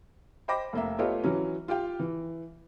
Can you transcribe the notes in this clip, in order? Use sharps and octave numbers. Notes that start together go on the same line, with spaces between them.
C5 D#5 G5 B5 D6 A#6
F1 A#3 E5
A3 B3 F4 G4 C#5 D#5
E3 F#3 C#4
F4 G4 F5 G5
E3